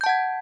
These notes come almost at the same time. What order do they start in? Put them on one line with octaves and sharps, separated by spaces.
G6 A5 F#5 G#6